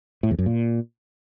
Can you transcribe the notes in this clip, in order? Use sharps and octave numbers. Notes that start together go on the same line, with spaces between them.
A2
E2
F#2
A#2